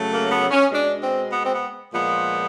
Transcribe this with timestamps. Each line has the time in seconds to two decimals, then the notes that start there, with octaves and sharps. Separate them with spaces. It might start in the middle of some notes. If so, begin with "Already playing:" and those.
Already playing: C#3 F#3 A3
0.10 A#3
0.32 B3
0.51 C#4
0.71 B2 G#3 D4
1.01 C4
1.32 B3
1.45 C4
1.53 B3
1.92 A#2 F3 G#3 B3